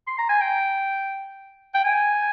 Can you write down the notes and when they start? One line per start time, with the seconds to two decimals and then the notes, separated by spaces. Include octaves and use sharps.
0.07 C6
0.18 A#5
0.29 G#5
0.41 G5
1.74 G5
1.85 G#5